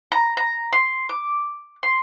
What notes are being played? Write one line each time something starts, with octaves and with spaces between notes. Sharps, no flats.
A#5
A#5
C6
D6
C6